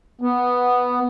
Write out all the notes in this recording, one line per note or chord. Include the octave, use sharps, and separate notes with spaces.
B3